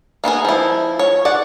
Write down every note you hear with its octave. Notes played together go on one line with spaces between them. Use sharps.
A#3 B3 E4 G#4
F3 E4
C#5
D5 F#5